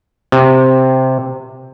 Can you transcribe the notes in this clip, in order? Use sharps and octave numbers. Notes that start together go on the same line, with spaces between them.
C3